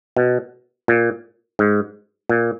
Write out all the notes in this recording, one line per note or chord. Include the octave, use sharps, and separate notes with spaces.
B2
A#2
G#2
A#2